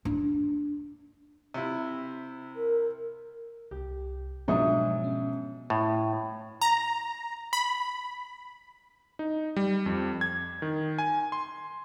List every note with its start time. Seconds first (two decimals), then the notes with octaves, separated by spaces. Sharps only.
0.05 D4
1.54 C3 E4
2.56 A#4
3.71 C2 G4
4.48 G#2 B2 F3 F#3 D4 G#4 E5 D#6
5.04 C#4
5.70 A2
6.62 A#5
7.53 B5
9.19 D#4
9.56 G3
9.86 F2
10.21 G#6
10.62 D#3
10.99 G#5
11.32 C6